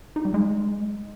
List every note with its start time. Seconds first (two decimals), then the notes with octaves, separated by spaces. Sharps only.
0.16 D#4
0.25 G3
0.34 G#3